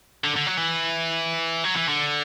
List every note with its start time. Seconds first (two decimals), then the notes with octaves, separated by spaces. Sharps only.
0.24 D3
0.36 D3
0.46 F#3
0.57 E3
1.65 F#3
1.76 E3
1.89 D3